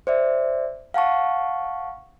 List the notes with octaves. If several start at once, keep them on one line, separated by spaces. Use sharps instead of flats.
C5 D5 E5
F5 F#5 A5 C#6